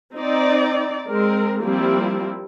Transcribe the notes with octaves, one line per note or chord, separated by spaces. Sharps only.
C4 D#4 D5
G#3 C4 A#4
F3 G3 A#3 C4 E4